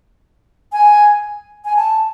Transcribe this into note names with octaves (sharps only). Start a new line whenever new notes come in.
G#5
G#5
A5